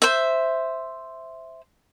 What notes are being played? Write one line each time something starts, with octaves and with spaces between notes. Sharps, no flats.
C5 E5